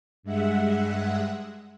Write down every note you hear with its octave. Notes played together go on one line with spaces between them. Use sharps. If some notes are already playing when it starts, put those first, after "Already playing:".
G2 G#3 E5 F#5